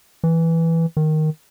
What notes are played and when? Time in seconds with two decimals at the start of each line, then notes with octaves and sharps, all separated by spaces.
0.24 E3
0.97 D#3